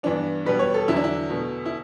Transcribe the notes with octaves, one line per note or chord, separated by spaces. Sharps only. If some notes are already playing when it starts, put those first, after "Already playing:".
G2 E3 B3 D4
B2 G3 B3 B4
C#5
A4
E2 D3 F#3 E4
D4
E4
B2 A3
E4